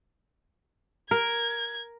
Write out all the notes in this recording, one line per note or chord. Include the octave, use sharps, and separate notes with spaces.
A#4 G#6